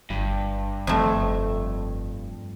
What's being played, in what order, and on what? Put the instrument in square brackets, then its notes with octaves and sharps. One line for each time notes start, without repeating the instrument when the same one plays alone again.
[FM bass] G1 [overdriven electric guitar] G2
[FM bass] F#1 [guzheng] F2 A3